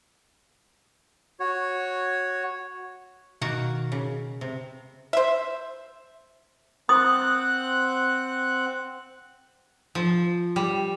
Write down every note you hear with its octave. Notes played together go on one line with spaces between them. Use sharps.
F#4 C#5
B2 D#3 A#3 F#4
C#3
C3
C5 E5
C4 F#5 D#6 F#6
F3
G3